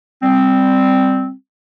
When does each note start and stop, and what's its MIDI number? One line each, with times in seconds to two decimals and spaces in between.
0.23 1.33 55
0.23 1.33 60